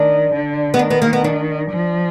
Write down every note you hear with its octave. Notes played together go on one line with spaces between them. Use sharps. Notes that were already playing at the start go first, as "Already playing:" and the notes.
Already playing: D#3 D4
D3
B3
D#3 D4
B3
A#3
B3
D4
F3